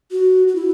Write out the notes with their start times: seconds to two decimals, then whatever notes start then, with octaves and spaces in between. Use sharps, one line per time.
0.11 F#4
0.48 F#4
0.55 E4